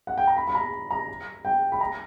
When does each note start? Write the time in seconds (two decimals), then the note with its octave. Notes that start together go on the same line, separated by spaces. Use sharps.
0.07 F#5
0.18 G5
0.27 A#5
0.36 B5
0.47 B5
0.55 A#5
0.91 A#5
1.45 G5
1.72 B5
1.81 A#5